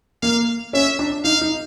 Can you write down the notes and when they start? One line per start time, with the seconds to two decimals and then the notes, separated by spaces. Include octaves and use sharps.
0.22 A#3 F5
0.73 C#4 E5
0.99 D4
1.24 D#4 F5
1.41 D#4